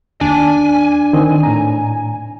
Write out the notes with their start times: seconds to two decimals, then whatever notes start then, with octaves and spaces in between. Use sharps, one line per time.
0.21 D#2 D4 G#5
1.13 D#3 C4 D#5
1.43 A2 A#5